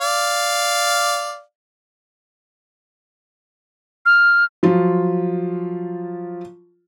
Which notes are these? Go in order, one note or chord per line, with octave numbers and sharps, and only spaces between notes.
D5 F5
F6
F3 F#3 F4